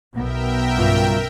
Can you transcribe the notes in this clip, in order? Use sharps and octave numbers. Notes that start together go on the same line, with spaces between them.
B1 B2 B3 A#4 E5 G5
G2 C#3 F4